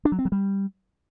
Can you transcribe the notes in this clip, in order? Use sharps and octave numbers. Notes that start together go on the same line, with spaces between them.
D4
F#3
C4
F#3
G3